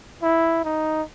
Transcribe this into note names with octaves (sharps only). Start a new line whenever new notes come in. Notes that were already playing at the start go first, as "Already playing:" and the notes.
E4
D#4